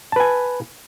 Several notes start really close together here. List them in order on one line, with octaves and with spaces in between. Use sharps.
A5 B4 G#5